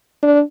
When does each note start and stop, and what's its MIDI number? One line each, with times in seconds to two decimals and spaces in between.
0.23 0.41 62